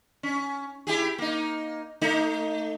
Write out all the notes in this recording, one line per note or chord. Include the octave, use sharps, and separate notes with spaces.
C#4
E4 G4 G#4
A#3 D#4
A3 D#4